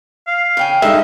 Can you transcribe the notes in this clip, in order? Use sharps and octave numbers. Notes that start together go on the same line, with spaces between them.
F5
C#3 G5 G#5
G2 G#3 D#4 A4 E5